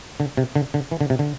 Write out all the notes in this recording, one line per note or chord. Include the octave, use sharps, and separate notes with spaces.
D3
C3
D3
D3
E3
D3
C3
D3